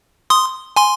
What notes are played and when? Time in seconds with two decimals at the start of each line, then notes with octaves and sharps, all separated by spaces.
0.30 C6 D#6
0.76 G#5 C6